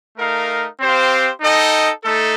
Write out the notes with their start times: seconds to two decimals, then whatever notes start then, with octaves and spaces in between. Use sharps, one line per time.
0.17 A3 D#4 A#4 F5
0.79 C4 G4 C5 F5
1.41 D#4 A4 D#5 G5
2.04 A3 D#4 A4